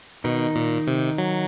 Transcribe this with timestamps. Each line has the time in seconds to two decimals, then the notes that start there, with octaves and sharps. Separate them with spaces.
0.24 B2 D#3 D#4
0.56 A#2
0.87 C3
1.18 F#3